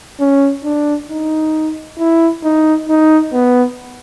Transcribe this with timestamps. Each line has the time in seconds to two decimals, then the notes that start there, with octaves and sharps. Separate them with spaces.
0.20 C#4
0.64 D4
1.09 D#4
1.99 E4
2.43 D#4
2.89 D#4
3.33 B3